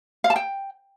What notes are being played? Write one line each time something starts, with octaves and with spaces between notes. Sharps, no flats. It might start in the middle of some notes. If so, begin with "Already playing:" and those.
F5
A5
G5